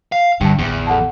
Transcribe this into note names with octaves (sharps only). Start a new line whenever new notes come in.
F5
G2 D3 G5 A5
A1 E2 D3
A4 F#5 A5